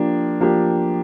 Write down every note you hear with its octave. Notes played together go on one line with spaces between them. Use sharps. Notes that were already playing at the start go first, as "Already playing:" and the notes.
Already playing: F3 A#3 D4 G4
F3 A#3 D4 G4